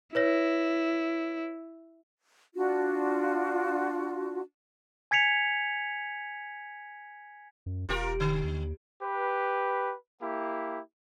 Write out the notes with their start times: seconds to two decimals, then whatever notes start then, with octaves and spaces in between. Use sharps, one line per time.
0.15 E4 B4 C#5 A#6
2.55 D4 F4 F#4
5.11 G#5 G#6 B6 C#7 F7
7.66 F#2
7.89 E1 F4 G4 A#4
8.20 D3
8.44 D#2
9.02 G4 B4
10.21 A#3 E4 G4